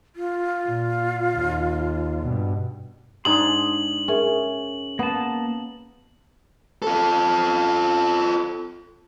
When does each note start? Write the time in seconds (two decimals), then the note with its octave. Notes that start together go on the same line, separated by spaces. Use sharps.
0.16 F4
0.66 A#2
1.35 D#2
2.22 G2 B2
3.25 G#2 D4 G#4 C6 D#6 F#7
4.08 C#4 G#4 A#4 E5
4.99 A#3 B3 A5
6.82 F4 A4